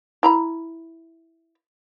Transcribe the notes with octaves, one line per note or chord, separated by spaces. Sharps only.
E4 A#5 B5